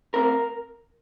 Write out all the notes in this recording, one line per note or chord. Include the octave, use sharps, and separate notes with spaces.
A3 C4 A#4